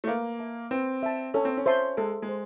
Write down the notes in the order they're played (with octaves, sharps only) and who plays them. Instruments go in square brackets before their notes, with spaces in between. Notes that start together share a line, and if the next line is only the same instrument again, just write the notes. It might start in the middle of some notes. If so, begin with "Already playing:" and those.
[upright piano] A3
[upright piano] A#3 [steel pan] B4
[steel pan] E5 A5
[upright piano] C4 [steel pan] B4
[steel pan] E5 A5
[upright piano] C#4 [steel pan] A4
[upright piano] C4
C#4
[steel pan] C5 E5 A5 C6
[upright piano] G#3 [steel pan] A4
[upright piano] G#3
[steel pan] C5